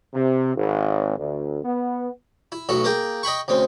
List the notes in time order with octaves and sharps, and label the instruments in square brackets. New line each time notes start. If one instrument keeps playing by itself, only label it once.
[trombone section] C3
G#1
D2
B3
[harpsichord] E4
B1 A2 F#4 E5
A#3 G#4 G5
D#5 G5 B5 C#6
D2 C#3 C4